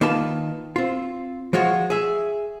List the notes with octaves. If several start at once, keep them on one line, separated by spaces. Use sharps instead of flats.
D#3 A#3 F4 B4 A5
C4 F4
F3 G#3 F4 F#4 C#5
G#4 E5